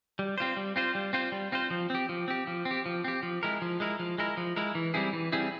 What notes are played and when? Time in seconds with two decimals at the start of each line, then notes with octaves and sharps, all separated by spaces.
0.19 G3
0.38 C4 F4 C5
0.57 G3
0.76 C4 F4 C5
0.95 G3
1.13 C4 F4 C5
1.32 G3
1.52 C4 F4 C5
1.70 F3
1.90 C4 G4
2.09 F3
2.28 C4 G4
2.47 F3
2.65 C4
2.71 G4
2.86 F3
3.04 C4 G4
3.23 F3
3.43 G#3 E4 A#4
3.62 F3
3.80 G#3 E4 A#4
3.99 F3
4.18 G#3 E4 A#4
4.37 F3
4.56 G#3 E4 A#4
4.75 E3
4.94 G3 C4 E4 G#4
5.13 E3
5.32 G3 C4 E4 G#4